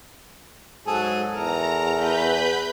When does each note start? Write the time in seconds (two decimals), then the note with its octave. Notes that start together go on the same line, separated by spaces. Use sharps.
0.87 G#2 F#3 G#4 A4
1.34 E2 A4 A#4 A#5
1.96 B4 B5 G6